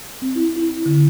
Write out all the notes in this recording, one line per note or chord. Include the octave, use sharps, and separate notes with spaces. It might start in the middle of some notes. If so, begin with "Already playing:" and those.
C4
E4
E4
D3